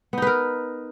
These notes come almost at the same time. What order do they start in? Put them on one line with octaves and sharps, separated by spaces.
B3 D#4 B4 A#4